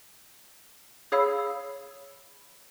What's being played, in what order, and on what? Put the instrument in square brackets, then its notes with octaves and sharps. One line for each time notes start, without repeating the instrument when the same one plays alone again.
[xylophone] G#4 C#5 F5 B5 E6